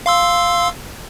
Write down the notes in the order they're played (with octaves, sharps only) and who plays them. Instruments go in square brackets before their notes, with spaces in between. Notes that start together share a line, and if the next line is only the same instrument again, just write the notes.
[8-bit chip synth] F5 C6 E6